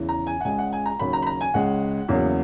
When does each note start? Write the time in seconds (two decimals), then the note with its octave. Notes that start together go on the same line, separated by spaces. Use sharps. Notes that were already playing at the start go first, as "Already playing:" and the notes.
Already playing: E2 C#3 E3
0.09 A#5
0.27 G#5
0.41 F#5
0.45 C#2 C#3 G#3 G#5
0.58 F#5
0.73 G#5
0.86 A#5
0.99 D#2 C#3 F#3 B5
1.13 A#5
1.22 B5
1.26 A#5
1.41 G#5
1.54 C#2 C#3 G#3 F#5
2.08 E2 C#3 F#3 A#3